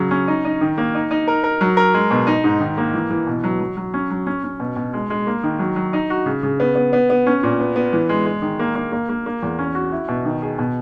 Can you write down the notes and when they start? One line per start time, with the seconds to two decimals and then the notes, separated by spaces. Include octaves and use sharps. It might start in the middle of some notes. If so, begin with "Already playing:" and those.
Already playing: C#3 F#3
0.11 C#4
0.28 D#4
0.45 D#4
0.61 D#3
0.78 A#3
0.95 D#4
1.11 D#4
1.28 A#4
1.44 A#4
1.61 F#3
1.77 A#4
1.94 G#3
2.11 B2
2.27 D#4
2.44 G#2
2.60 D#3
2.77 A#3
2.94 E3
3.11 E3
3.27 B2
3.44 F#3
3.60 F#3
3.77 F#3
3.94 C#4
4.10 F#3
4.27 C#4
4.44 C#4
4.60 B2
4.76 B2
4.93 G#3
5.10 G#3
5.27 A#3
5.43 D#3
5.59 F#3
5.76 F#3
5.93 D#4
6.10 F#4
6.26 C#3
6.43 C#3
6.60 B3
6.76 B3
6.93 B3
7.10 B3
7.26 C#4
7.43 A#2
7.60 B3
7.76 B3
7.93 E3
8.09 G#3
8.26 G#3
8.42 D#3
8.59 A#3
8.75 A#3
8.92 A#3
9.09 A#3
9.26 A#3
9.43 E2
9.59 C#4
9.75 F#4
9.92 E4
10.08 B2
10.25 D#3
10.42 G#4
10.59 B2